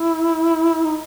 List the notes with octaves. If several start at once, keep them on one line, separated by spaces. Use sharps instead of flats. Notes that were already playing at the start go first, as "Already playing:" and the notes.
Already playing: E4
D#4